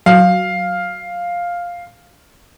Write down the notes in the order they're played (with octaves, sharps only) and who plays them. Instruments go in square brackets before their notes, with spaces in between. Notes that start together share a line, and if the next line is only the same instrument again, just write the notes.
[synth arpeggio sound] F#3 [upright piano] F5